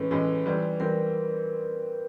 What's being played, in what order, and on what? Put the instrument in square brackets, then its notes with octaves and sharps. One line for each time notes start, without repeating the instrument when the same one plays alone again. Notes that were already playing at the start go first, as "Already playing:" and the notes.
Already playing: [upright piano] A2 E3 G#3 C#4 [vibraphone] B4
[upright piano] A2 E3 G#3 C#4
E3 G3 C4
[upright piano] E3 G3 C4 [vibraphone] A#4